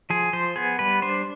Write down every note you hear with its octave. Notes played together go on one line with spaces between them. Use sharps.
F3 G#4
F3 C5
B3 G#4
G3 B4
D4 C5